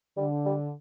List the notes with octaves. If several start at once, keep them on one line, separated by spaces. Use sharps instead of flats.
D3 G3
G3